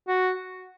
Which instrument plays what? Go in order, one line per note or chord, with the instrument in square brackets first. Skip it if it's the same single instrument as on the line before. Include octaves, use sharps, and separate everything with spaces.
[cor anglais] F#4